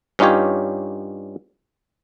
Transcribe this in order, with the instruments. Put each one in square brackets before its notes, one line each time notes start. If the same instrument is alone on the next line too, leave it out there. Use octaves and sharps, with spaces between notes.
[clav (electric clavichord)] G2 C#4 D#4 F4 G4 C#5